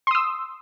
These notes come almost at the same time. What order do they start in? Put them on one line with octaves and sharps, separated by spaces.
C6 D#6 E6